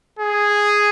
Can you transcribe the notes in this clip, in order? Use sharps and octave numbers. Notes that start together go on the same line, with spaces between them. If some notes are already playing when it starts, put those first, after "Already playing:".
G#4